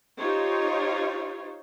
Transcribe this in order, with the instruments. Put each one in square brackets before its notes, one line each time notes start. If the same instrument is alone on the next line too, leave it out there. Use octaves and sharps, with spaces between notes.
[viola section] D#4 F4 G4 C5 C#5